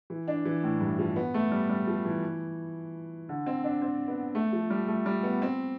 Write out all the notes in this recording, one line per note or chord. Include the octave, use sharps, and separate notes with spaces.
E3
D4
E3
A2
G2
F3
B3
A3
G3
G3
F3
E3
D3
C4
D4
C4
B3
A3
F3
G3
A3
G3
B3
C4